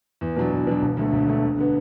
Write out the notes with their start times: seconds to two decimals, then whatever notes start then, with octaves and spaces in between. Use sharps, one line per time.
0.21 E2
0.37 B2 F#3 D4
0.52 E2
0.67 B2 F#3 D4
0.82 E1
0.97 D2 D3 A3
1.13 E1
1.27 D2 D3 A3
1.43 D2
1.58 D3 B3